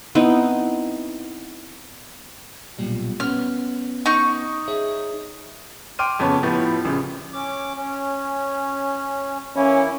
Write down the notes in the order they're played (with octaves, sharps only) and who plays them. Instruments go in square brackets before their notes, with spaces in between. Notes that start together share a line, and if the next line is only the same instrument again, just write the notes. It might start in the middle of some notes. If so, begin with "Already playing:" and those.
[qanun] B3 C4 D#4 E4
[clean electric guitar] B1 A#2 G3
[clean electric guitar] B3 C#4 [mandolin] F6
[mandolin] D#4 C#6
[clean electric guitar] G#4 C#5 E5
[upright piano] G5 C6 D6 F6 D#7
F2 C#3 B3 C#5
A2 F3 B3 G4
A#1 C#3
[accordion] C#4 D6
C#4
[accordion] E3 A#3 E4 [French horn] C#4